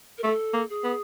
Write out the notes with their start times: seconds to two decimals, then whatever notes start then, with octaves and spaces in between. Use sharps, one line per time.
0.18 A#4
0.23 A3 A4
0.53 A#3
0.69 G#4
0.84 B3